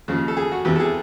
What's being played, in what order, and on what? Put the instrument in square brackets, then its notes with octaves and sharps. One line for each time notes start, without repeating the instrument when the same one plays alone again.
[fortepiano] D#2 C#3 F3
A4
G#4
F#4
E2 C3 E3 G4
A4
G#4